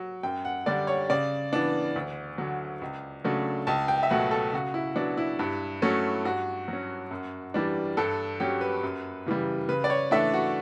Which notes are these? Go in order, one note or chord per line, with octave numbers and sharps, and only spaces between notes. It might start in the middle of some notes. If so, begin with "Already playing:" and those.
Already playing: F#3
F#2 G5
F#5
D3 G3 D4 D5
C#5
C#3 D5
E3 B3 D4
D2
D3 F#3
C#2
C#3 F#3 A3 D4
C#2 A5
G5
E5
B2 F#3 A3 F#5
A4
C#3 F#4
E4
F#3 B3 D4
E4
G2
F#3 A3 C#4
G2 F#4
F#3 C#4
F#2
E3 G3 D4
G2 A4
F#3 C#4 G4
B4
F#2
C#3 E3 G3
C#3 B4
D5
C#5
E3 A3 D4 E5
F#4